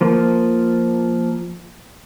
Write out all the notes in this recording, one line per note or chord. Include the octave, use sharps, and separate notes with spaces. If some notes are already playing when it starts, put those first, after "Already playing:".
F3 A#3